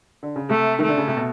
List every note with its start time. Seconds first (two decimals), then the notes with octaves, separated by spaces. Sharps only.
0.23 D3
0.36 C#3
0.49 C3 A3
0.79 D#3 A3
0.88 D3
0.98 C#3
1.07 C3
1.17 B2